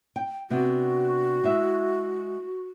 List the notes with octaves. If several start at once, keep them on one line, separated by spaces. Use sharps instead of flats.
G5
C3 B3 D4 F#4
G#3 E4 E5